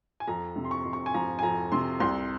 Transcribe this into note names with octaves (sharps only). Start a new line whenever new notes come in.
G#5
F2 A#5
C3
C6
C#6
F2
C#6
G#5
F3 A#5
G#5
F2 A#5
C3 C6
C2 C6